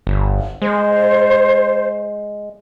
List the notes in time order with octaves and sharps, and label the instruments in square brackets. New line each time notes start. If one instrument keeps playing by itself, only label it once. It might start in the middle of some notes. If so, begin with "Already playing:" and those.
[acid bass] G1
[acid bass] G#3 [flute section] C5